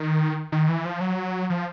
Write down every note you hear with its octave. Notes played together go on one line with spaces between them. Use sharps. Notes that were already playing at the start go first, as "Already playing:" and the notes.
Already playing: D#3
D#3
E3
F3
F#3
F3